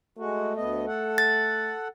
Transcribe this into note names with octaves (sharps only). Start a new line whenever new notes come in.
G#3 A3 F#4
D2 B3 D#5
A4 F#5
A6